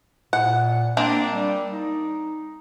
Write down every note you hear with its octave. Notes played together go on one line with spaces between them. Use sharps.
A#2 F#5
A#3 C4 D4
G3
D#4